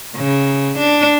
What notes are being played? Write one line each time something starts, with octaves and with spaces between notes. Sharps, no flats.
C#3
D4